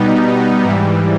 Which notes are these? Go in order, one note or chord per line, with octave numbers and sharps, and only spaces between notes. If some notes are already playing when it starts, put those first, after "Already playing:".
Already playing: B2 G3 B3 D#4
G#2 E3 G3